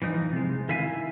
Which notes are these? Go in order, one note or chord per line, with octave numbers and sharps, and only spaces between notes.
E3 F3 D#4
C3 G#3
D#3 E4 E5 F5 G#5